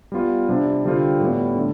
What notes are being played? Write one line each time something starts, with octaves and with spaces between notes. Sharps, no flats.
G3 B3 F4
C3 G3 D4
D3 G3 C4 F4
A2 G3 B3
D3 A3